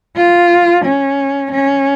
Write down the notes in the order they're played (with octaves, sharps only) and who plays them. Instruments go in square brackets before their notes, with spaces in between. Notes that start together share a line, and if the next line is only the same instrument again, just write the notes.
[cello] F4
C#4
C#4